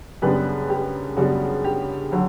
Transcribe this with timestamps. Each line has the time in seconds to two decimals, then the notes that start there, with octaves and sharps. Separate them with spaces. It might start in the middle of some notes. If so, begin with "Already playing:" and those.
0.22 F#2 C#3 G3 B3 D4 G4 B4
0.70 G4
1.17 F#2 C#3 G3 B3 D4 F#4
1.64 G4
2.12 D3 F#3